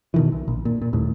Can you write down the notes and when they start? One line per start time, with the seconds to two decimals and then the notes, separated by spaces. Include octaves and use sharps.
0.14 B2 D#3 E3
0.32 B1
0.48 A#1
0.65 A#2
0.82 A#2
0.93 D#1 D#2 A2